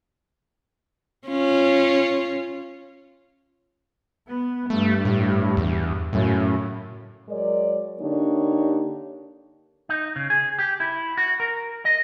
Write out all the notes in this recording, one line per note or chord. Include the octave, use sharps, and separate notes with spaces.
C#4 F4
B3
G2 A3
A2
E2
F#2 A2 C#3
F#3 G#3 A#4 C#5 D5
D3 A#3 D4 D#4 G4 C#5
D#4
C#3
G#4
G4
E4
F#4
A#4
D#5